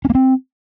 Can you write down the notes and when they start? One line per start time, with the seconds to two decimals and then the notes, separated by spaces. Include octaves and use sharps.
0.05 C#4
0.10 A#3
0.15 C4